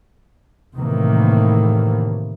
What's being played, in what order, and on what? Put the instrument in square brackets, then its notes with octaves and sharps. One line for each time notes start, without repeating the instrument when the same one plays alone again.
[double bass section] A2 C3 D#3 E3 A#3